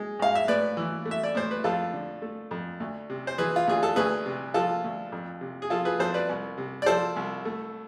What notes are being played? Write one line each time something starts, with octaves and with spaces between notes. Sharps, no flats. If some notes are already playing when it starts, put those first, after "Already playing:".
Already playing: G#3
G#2 F5
E5
A2 B4 D5
E3
A3
E5
D5
A2 C5
B4
F2 F4 A4
D3
A3
F2
D2
C3
C5
E3 G#4 B4
F4
D2 G#4
A4
D2 G#4 B4
C3
F3 F4 A4
D2
F2
C3
G#4
F3 F4 A4
G#4 B4
F2 A4 C5
B4 D5
C2
C3
D5
F3 A4 C5
C2
A3